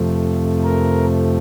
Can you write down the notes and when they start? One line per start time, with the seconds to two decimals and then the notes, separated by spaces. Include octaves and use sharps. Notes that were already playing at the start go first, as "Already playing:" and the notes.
Already playing: F2 C3 F3 A3
0.64 A#4